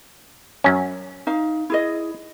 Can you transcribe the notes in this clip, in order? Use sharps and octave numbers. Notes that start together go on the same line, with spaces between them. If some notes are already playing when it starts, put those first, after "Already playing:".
F#2 C#4
D#4 F5
E4 G#4 D#5